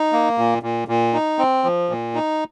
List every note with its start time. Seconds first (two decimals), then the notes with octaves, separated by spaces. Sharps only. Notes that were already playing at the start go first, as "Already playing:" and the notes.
Already playing: D#4
0.13 A#3
0.38 A#2
0.63 A#2
0.88 A#2
1.14 D#4
1.39 C4
1.64 F3
1.90 A#2
2.15 D#4